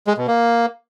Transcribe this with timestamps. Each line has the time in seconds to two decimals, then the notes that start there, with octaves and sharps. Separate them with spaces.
0.07 G#3
0.17 B2
0.27 A#3